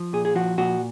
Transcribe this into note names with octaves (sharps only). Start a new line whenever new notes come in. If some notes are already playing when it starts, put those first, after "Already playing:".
Already playing: F3
A#2 G#4
G#4
F3 F#4
A#2 F#4